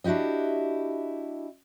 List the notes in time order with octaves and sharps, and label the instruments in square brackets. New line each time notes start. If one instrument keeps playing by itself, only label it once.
[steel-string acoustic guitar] D4 E4 F#4 G4 D#5